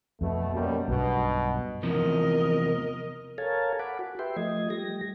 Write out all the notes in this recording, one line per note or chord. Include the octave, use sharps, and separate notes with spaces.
F2 B2 A3
F#2 B2 G3 A#3
B1 G2 B2
E2 C3 F3 A#4 D#5
A4 A#4 C#5 F5 G#5 A5
F#5 B5 D6
F#4
G4 B4 E5 G5 C6
F3 A3 D#5 G#6
G3 G4 A#6